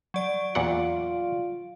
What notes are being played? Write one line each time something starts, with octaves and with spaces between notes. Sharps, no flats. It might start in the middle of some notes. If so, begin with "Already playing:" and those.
F#3 D5 D7
E2 A#2 F4 F#5